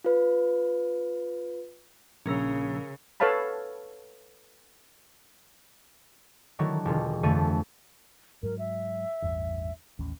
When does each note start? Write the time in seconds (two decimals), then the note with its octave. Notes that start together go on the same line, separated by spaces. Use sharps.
0.04 F4 B4
2.26 A#1 C#3 C#4 A#4 E6
3.20 A4 B4 C#5 F5 A5 B5
6.59 D3 D#3 F#3 A3 E4
6.85 E1 D3 F4
7.23 G1 F2 D3 A3 D#7
8.43 G#2 F#3 A#4
8.59 E5
9.22 A1 E2 G2
9.99 A1 D#2 C#4